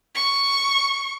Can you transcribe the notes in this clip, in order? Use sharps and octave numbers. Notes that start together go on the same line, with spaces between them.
C#6